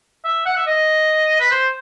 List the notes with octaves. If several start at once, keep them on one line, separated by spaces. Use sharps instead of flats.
E5
F#5
E5
D#5
B4
C5